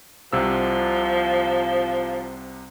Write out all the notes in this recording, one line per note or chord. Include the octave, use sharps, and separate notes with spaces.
C2 C3 F3 E6